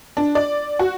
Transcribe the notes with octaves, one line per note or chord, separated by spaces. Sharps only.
D4
D5
F#4